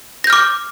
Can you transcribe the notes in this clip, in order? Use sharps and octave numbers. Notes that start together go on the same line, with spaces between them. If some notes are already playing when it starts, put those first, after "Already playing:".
D6 F6 G6 A#6